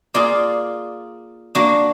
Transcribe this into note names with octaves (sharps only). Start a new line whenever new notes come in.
A#3 F4 G#4 D5
A#3 D4 F#4